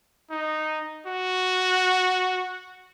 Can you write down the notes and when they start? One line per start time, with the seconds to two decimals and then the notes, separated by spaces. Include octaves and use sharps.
0.31 D#4
1.07 F#4